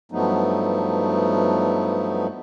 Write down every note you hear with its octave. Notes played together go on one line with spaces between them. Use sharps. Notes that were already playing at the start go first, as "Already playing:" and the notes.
G2 F3 F#3 A3 B3 D#4